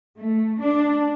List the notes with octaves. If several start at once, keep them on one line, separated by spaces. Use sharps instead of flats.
A3
D4